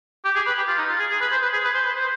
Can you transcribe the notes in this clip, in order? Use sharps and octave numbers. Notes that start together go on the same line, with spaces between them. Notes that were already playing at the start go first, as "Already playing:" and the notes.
G4
G#4
B4
G4
F4
D#4
F4
G#4
G#4
B4
C5
B4
G#4
B4
C5
B4
C5